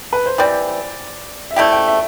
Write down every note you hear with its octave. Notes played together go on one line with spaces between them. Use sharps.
B4
C5
E3 G3 C4 D5
E5
A3 C4 E4 G4 D5
G5
E5